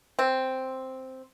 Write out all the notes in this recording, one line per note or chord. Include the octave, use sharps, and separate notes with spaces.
C4